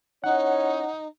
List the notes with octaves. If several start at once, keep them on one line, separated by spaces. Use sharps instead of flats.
C#4 D#4 E4 C#5 F#5